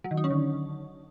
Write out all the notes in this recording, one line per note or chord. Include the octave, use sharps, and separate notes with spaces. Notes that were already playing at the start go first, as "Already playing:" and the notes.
F#3
D#3
D#4
C#4
D3